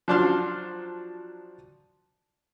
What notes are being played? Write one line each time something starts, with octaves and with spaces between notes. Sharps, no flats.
F3 F#3 D4 A5 C6 F6